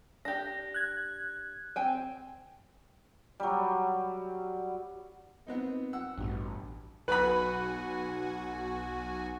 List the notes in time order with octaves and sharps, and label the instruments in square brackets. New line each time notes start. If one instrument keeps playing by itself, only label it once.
[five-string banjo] D4 G4 [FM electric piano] A#6
[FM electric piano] F#6 G#6
[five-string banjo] C4 G5 G#5
[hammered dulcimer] F#3 G3
[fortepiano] B3 C4 D#4
F#5 E6
[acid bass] A1 [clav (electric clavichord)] G2 B2
[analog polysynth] B1 F#4 G#5 [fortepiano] B4 B5